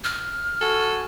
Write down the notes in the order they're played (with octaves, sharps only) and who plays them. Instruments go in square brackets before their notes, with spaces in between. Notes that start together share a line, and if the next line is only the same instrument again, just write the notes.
[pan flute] F6
[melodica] F#4 G#5 [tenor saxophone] A4